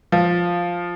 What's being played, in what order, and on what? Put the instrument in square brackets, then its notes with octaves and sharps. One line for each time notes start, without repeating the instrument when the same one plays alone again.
[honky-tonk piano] F3